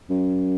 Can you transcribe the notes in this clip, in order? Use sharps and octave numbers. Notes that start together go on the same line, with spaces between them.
F#2